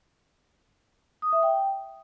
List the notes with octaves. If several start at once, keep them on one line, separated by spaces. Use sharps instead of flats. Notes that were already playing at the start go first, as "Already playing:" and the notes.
D#6
E5
G5